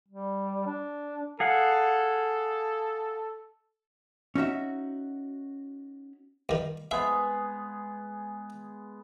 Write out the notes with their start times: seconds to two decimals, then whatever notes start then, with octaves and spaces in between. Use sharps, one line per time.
0.09 G3
0.66 D4
1.40 G#4 A4 F5 F#5
4.35 C#4 D#4 F#4 E5
6.49 G2 D#3
6.91 G#3 B3 G#4 E5